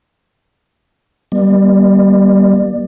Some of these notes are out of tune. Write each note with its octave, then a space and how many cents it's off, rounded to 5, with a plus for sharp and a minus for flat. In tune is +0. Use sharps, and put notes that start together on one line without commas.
G3 -15 A#3 +45 D5 +30